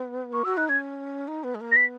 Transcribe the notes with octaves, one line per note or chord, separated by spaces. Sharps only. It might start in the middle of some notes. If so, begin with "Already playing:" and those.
Already playing: B3
A#3 C#6
F#4 E6
D#4 F#6
C#4 G#6
D#4
B3
G#3
A#3
A#6
B3 B6